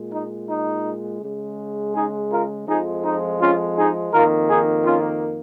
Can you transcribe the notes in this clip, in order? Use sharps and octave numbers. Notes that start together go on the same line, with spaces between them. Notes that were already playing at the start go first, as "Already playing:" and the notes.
Already playing: A#2 G#3
D#4
D#4
C#3 G#3
D#4 G#4
F4 A#4
F2 F3 G#3 D#4 G#4
D#4
C#4 F4
D#4 G#4
F2 D#3 A#3 F4 A#4
D#4 G#4
C#4 F4